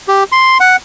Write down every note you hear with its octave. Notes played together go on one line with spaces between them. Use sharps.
G4
C6
F#5